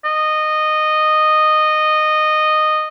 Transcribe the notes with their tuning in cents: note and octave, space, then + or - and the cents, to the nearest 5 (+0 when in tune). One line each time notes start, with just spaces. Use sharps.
D#5 -15